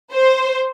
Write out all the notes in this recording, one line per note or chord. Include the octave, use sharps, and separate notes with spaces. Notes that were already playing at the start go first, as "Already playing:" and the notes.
C5